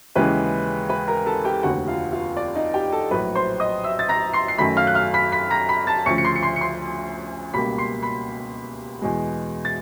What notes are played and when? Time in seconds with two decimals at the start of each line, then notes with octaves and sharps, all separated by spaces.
0.15 D#2 C#3 E3 G#3 B4 B5
0.89 B4 B5
1.08 A#4 A#5
1.26 A4 A5
1.44 G4 G5
1.63 F1 D#2 D3 F#4 F#5
1.88 F4 F5
2.12 F4 F5
2.37 D5
2.55 D#4 D#5
2.74 G4 G5
2.92 A4 A5
3.11 A#1 A2 F#3 B4 B5
3.35 C5 C6
3.60 D#5 D#6
3.84 E5 E6
3.99 A6
4.09 A#5 A#6
4.33 C6 C7
4.48 C7
4.58 F#2 D#3 F#3 A3 B5 B6
4.77 F5 F6
4.87 F#6
4.95 F5 F6
5.14 B5 B6
5.32 B5 B6
5.50 A#5 A#6
5.69 B5 B6
5.87 A5 A6
6.06 D2 C#3 F3 C#6 C#7
6.18 C#7
6.25 C6 C7
6.35 C#7
6.43 C6 C7
6.56 C#7
6.61 C6 C7
7.54 C#2 B2 G3 A#3 B5 B6
7.78 C6 C7
8.03 B5 B6
9.02 E2 B2 G#3
9.65 A6